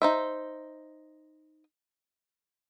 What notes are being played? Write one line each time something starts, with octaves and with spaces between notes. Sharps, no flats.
D#4 C5 E5